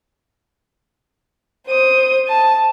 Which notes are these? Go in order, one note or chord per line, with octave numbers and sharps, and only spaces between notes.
C5 D#6
A5